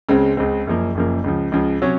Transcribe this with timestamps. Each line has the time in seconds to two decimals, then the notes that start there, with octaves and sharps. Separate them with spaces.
0.09 C#2 C#3 G#3 C4
0.37 C#2 C#3 G#3 C4
0.66 F#1 F#2 C#3 F3 A#3
0.95 F#1 F#2 C#3 F3 A#3
1.24 C#2 C#3 F3
1.52 C#2 C#3 F3
1.81 C3 F#3 C#4